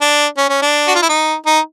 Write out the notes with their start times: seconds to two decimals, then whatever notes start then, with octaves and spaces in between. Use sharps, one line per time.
0.01 D4
0.37 C#4
0.49 C#4
0.62 D4
0.88 F#4
0.95 F4
1.02 E4
1.09 D#4
1.46 D#4